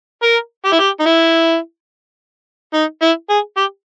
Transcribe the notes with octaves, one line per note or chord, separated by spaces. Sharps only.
A#4
G4
E4
G4
D#4
E4
D#4
E4
G#4
G4